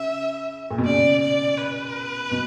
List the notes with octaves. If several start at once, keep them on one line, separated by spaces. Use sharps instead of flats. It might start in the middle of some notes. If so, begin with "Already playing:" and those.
Already playing: C#3 E5
A#2
B2
C#3 D5
D5
B4
B2